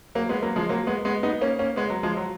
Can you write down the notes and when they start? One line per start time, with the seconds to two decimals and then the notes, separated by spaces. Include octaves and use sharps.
0.15 F#3 A#3
0.29 G#3 B3
0.42 F#3 A#3
0.56 F3 G#3
0.69 F#3 A#3
0.87 G#3 B3
1.05 G#3 B3
1.23 B3 D#4
1.41 A#3 C#4
1.59 A#3 C#4
1.76 G#3 B3
1.90 F#3
2.03 F3 G#3
2.17 F#3